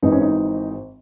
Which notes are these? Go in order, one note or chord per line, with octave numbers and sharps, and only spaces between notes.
G#1 G#2 E3 D#4
C#4
D#4